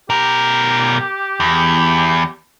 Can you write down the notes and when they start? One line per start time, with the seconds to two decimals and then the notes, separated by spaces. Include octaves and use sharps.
0.10 B2 G4 A#4
1.40 E2